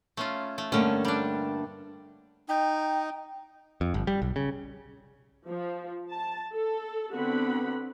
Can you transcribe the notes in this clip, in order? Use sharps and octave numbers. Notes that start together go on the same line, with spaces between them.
A3 C#4 F4
A3
G2 D3 A3 A#3 C#4
G3 D4
D#4 G5
F2
G1
G3
B1
C#3
F3
A5
A4
D3 B3 C4 F#4 F#5 B5